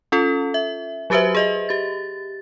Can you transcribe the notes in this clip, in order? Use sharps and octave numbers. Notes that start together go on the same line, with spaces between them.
C#4 F4 A4
E5
F#3 F#4 G4 B4 C5 E5
G#4 D#5 E5
G4 A6